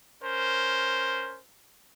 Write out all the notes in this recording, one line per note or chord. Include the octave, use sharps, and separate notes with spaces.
C#4 A#4 C5